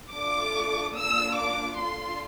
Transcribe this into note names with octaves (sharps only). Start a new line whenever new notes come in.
A3 D4 F4 A4 D6
A#3 D4 F4 E6
D6
D4 F4 A4 C6